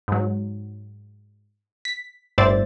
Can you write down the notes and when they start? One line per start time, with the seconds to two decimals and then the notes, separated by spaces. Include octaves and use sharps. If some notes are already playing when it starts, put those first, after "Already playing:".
0.08 G#2 F#3
1.85 B6
2.38 G1 A2 C5 D5 E5 A6